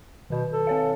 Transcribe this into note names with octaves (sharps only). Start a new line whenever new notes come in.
B2 D#3 B4
A4
C4 C#5 F5